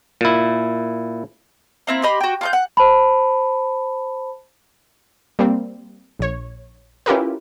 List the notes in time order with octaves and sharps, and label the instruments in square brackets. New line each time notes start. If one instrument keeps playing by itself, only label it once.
[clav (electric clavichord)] A#2 E4
[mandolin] A#3 C4 E4
G4 D#5 B5 C6
F#4 G5
F4 C#6 G6
F#5
[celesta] C5 A5 B5
[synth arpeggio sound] G3 A#3 C4
A#1 C#5
C#4 E4 F4 G4 A#4 B4